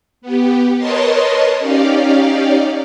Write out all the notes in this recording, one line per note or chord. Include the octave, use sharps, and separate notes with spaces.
B3 G4
A#4 B4 C#5 D#5 A5 C6
C#4 D#4 G4 D5 F5